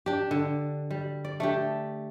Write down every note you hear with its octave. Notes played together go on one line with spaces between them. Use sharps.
D4 G4
D3
G3
D5
A3 D4 G4